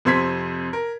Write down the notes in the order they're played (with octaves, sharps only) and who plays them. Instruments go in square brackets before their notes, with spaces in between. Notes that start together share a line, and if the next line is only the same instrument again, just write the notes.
[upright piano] F2 C3 C5 C6 G#6 B6
A#4